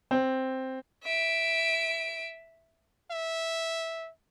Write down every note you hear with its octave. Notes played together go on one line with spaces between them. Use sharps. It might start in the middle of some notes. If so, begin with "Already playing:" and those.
C4
E5 D7
E5